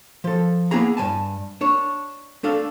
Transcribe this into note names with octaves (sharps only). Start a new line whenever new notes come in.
F3 A4
A#3 B3 E4 G#4 A#5
G2 D#3 G#5 A5
D4 C#5
A3 D4 A4 F5